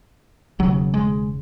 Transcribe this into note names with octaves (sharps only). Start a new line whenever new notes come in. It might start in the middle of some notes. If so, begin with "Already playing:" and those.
E1 D#2 C#3 F#3
G#3